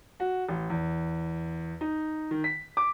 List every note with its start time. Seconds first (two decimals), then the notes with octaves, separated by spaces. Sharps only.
0.20 F#4
0.49 A1
0.70 E2
1.81 D#4
2.31 D#3
2.44 B6
2.77 D6